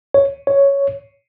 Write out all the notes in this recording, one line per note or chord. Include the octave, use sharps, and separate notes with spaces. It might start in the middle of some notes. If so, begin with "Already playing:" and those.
C#5
C#5